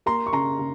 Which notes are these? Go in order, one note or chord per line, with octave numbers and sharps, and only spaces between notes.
A#3 A#5 C6
C#6
C#3 A#5 C6
C#3